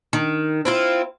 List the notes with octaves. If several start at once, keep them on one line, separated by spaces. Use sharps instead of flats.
D#3
C4 E4 F4